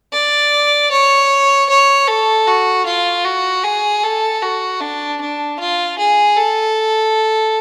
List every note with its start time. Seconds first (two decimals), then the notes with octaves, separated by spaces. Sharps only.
0.13 D5
0.91 C#5
1.69 C#5
2.07 A4
2.47 F#4
2.86 F4
3.25 F#4
3.64 G#4
4.03 A4
4.42 F#4
4.81 D4
5.20 D4
5.59 F4
5.98 G#4
6.37 A4